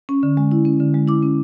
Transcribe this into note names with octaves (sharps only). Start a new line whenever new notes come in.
C#4
D3
G#3
E4
C#4
D3
G#3
E4 D6
C#4